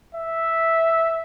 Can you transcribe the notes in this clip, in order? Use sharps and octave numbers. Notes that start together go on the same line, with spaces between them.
E5